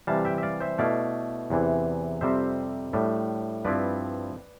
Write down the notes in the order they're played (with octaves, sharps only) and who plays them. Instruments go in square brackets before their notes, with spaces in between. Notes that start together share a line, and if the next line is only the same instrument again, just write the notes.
[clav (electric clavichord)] C3 E3 G3 F5 A5
E5 G5
E5
D5 F5
C5 E5
B2 A3 E4 D5 F5
E2 C3 E3
F2 C3 G3 C4 C5 E5
A2 G3 D4
G2 F3 C4 E4 B4 D5